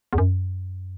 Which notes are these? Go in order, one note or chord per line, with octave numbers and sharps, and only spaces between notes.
E2
F#2